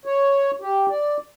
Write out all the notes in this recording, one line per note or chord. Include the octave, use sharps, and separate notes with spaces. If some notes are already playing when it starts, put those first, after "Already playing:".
C#5
G4
D5